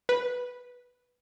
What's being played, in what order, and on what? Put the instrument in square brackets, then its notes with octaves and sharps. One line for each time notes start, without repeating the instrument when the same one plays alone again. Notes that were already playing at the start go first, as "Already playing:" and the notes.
[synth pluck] B4